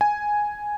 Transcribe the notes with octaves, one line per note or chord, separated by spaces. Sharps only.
G#5